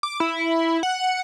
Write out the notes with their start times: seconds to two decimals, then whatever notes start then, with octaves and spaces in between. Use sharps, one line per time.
0.03 D6
0.20 E4
0.83 F#5